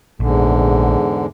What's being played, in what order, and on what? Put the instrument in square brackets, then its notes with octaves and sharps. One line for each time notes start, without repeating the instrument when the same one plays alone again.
[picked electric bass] A#1 [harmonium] E2 G#2 D3